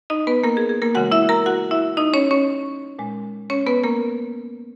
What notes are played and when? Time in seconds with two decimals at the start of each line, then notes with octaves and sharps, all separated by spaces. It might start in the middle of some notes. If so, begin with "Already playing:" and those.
0.10 D#4 D#5
0.27 B3 B4
0.44 A#3 A#4
0.57 G#4
0.69 G#4
0.82 A#3 A#4
0.95 C#3 E3 G#3 F#4 F#5
1.11 E4 E5
1.29 A#4 A#5
1.46 F#4 F#5
1.71 E4 E5
1.97 D#4 D#5
2.14 C#4 C#5
2.31 C#4 C#5
2.99 A#2 G#3
3.50 C#4 C#5
3.66 B3 B4
3.84 A#3 A#4